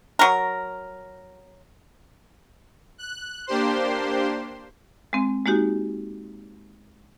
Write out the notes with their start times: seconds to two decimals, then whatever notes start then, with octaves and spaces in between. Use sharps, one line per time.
0.19 F#3 A#4
2.98 F#6
3.47 A#3 D4 G4 C5 C6
5.13 G#3 C4
5.46 G#3 A#3 D#4 F#4 G4